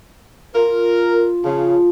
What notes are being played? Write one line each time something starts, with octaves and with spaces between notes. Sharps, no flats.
F4 A#4
C#3 F3